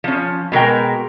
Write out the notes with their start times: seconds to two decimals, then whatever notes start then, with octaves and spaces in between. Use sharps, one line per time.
0.04 F3 C#4
0.52 B2 G#3 A#4 G5